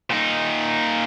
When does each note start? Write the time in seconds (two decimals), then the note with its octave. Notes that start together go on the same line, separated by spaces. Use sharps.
0.10 A#2 D#4